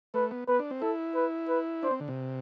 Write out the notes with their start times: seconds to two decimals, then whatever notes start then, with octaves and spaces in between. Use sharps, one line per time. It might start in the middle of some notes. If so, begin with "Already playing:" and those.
0.14 A3 B4
0.31 B3
0.47 B3 B4
0.59 D4
0.70 C4
0.81 E4 A4
1.15 B4
1.49 B4
1.83 D4 C5
1.91 C4
2.00 D3
2.08 C3